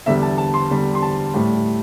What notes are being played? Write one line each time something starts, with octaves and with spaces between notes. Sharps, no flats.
E2 D3 G3 E5
A5
A5
C6
E2 D3 G3
C6
A5
A2 G3